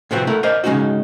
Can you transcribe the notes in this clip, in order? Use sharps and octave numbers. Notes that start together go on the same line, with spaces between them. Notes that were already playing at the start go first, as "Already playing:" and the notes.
A2 C3 F3 B3 C4 F#4
A3 E4 A#4 F#5
A#4 C5 D5 D#5 G#5
C#3 G#3 A3 C#4 D#4 F#4